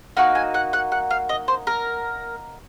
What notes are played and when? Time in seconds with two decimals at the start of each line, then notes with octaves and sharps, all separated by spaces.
0.17 A#3 D#4 F#4 F#5
0.35 G#5
0.54 F#5
0.73 F#5
0.92 F#5
1.11 F5
1.29 D#5
1.48 C5
1.67 A#4